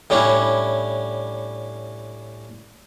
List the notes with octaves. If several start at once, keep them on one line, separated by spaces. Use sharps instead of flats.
A2 G3 C#4 D4 E4